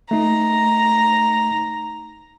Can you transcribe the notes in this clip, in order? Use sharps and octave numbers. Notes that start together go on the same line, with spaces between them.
A3 D#4 A#5